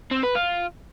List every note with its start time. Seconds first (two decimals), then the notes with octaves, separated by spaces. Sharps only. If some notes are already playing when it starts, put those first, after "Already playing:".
0.11 C4
0.23 B4
0.35 F4